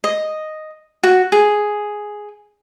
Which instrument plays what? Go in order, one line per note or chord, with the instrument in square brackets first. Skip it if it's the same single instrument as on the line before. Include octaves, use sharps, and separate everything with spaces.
[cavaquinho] D#5
F#4
G#4